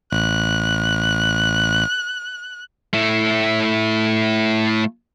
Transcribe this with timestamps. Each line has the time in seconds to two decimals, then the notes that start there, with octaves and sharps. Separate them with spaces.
0.12 A1 F#6
2.93 A3 E4